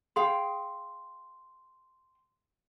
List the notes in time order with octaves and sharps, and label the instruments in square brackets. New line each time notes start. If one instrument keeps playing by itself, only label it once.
[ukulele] G#4 F5 G5 [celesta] C6